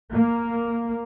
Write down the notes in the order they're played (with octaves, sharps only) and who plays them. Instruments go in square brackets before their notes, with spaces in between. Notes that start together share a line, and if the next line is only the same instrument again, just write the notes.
[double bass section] A#3